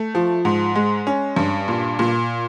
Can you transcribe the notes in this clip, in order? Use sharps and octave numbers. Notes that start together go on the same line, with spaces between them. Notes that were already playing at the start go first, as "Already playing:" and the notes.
Already playing: A3
F3
G#2
G#3
C#4
G2
A#2
A#2